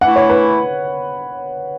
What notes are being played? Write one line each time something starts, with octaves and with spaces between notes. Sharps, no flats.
E3 A3 E4 F#5
C#5
B4